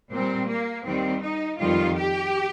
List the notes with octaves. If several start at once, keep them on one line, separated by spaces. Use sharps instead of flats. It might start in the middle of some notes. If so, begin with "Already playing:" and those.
A#2 G3 C4
A#3
D#2 D#3 G3 C4
D#4
F2 D#3 G3 F4
G4